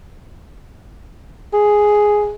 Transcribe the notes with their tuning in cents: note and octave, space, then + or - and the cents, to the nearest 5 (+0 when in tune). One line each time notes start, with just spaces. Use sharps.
G#4 +0